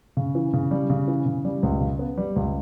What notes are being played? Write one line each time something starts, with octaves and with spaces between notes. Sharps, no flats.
C#3
E3
C#3
G3
C#3
E3
C#3
G3
C#2
C#3
B3
G3
C#2